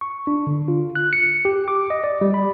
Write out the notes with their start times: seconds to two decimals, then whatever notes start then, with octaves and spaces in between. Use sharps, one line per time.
0.01 C#6
0.27 D4
0.47 D3
0.68 F4
0.95 F#6
1.13 C#7
1.45 G4
1.68 D6
1.90 D#5
2.04 D5
2.21 G3
2.34 B5